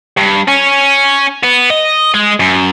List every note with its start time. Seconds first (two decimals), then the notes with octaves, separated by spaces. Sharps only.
0.17 G2
0.48 C#4
1.43 B3
1.70 D#5
2.14 G#3 G#4
2.40 F#2